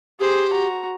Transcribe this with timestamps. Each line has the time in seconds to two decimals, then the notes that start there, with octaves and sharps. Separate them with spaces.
0.20 G4 G#4 C5
0.49 F#4 A#5